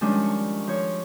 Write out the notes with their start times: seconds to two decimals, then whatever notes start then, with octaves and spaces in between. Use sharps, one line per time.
0.01 D#3 F3 G3 G#3 C#4 D4
0.22 C#6
0.67 F3 C#5